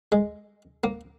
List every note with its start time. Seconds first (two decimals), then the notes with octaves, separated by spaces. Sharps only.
0.12 G#3
0.84 A#3